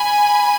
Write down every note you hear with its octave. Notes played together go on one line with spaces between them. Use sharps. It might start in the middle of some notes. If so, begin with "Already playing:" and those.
Already playing: G#5 B5